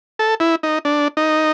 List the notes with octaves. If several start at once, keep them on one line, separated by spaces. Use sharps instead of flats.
A4
E4
D#4
D4
D#4